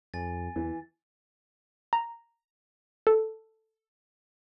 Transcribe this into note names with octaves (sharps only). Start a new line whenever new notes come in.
F2 G#5 A6
E2 E3
A#5
A4